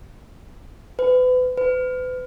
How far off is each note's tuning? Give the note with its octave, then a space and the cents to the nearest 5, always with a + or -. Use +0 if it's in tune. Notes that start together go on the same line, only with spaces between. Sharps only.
B4 +35
B4 +40